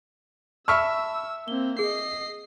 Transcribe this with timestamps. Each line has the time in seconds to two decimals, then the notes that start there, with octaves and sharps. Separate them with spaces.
0.68 E5 A5 B5 C#6 E6 F6
1.48 A#3 C4 G7
1.79 G#4 D#5 C7